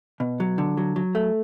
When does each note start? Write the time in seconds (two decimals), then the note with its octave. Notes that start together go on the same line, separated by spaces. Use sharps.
0.20 B2
0.40 F#3
0.58 D3
0.77 F#3
0.96 F#3
1.15 A3